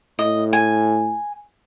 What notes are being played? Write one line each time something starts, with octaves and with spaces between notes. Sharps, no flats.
A2 D#5
G#5